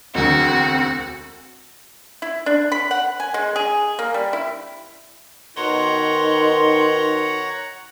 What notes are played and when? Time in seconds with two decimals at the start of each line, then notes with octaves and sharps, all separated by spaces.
0.15 E1 D2 C4 F#4
2.22 E4
2.46 D4
2.72 B5
2.91 F#5
3.20 G#5
3.34 G#3
3.56 G#4
3.99 A#3
4.14 G3
4.33 E4
5.56 B2 D#3 D#4 C#5 F#5 A#5 C6